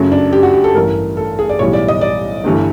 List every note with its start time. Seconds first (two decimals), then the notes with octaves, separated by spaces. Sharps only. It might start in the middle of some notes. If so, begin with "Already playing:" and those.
Already playing: F#2 C#3 F#3 A3
0.12 D4
0.33 G4
0.43 F#4
0.54 G4
0.64 A4
0.74 A1 G2 E3 A3 A#4
1.17 A4
1.39 G#4
1.49 D5
1.59 B1 A2 E3 G3 C#5
1.73 D5
1.88 D#5
2.01 D5
2.44 G1 G2 E3 A3